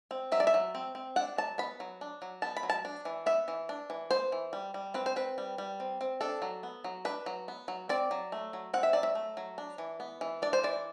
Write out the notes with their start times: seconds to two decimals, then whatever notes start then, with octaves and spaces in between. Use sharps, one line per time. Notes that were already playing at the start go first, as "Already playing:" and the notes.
0.11 C4
0.32 F#3 E5
0.40 D5
0.47 E5
0.54 F#3
0.75 C4
0.95 C4
1.16 D4 F#5
1.38 F#3 A5
1.58 B3 B5
1.80 F#3
2.01 D4
2.22 F#3
2.42 B3 A5
2.57 B5
2.63 F#3
2.70 A5
2.85 D4
3.05 E3
3.26 B3 E5
3.48 E3
3.69 D4
3.90 E3
4.11 B3 C5
4.32 E3
4.53 G3
4.74 G3
4.94 C4 B4
5.06 C5
5.16 C4 B4
5.38 G3
5.58 G3
5.80 C4
6.01 C4
6.21 D4 A4
6.42 F#3
6.63 B3
6.84 F#3
7.05 D4 B4
7.26 F#3
7.48 B3
7.68 F#3
7.89 C4 D5
8.11 F#3
8.32 A3
8.53 F#3
8.73 C4 F#5
8.83 E5
8.93 F#3 D5
9.03 E5
9.15 A3
9.37 F#3
9.58 D4
9.78 E3
10.00 B3
10.21 E3
10.42 D4 D5
10.53 C5
10.63 E3 D5